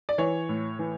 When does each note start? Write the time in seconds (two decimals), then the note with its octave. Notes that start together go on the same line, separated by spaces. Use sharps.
0.09 D5
0.18 E3 C#5
0.49 A2
0.79 E3